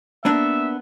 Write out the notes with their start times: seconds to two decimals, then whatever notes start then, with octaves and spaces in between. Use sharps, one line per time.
0.25 A#3 B3 D4 E5